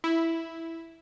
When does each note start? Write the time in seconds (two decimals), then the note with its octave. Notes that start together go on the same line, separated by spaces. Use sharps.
0.04 E4